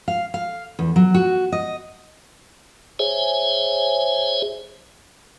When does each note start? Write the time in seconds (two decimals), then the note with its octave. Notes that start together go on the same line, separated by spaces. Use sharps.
0.08 F5
0.34 F5
0.79 E2
0.96 F#3
1.14 F#4
1.52 D#5
2.99 G#4 C5 C#5 E5 G#5